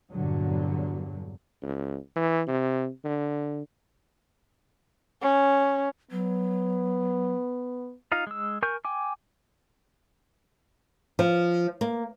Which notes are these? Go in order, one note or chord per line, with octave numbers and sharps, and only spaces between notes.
E2 G2 A#2 D3 F#3
C#2
E3
C3
D3
C#4
F#3 B3
D#4 F4 F5 A#5
G#3 E6
A#4 G#5 C#6 G6
G5 G#5 D6
F3
A#3